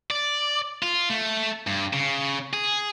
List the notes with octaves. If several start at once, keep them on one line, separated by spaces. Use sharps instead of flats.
D5
F4
A3
G2
C#3
G#4